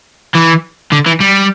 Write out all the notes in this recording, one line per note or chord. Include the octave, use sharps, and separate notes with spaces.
E3
D3
E3
G3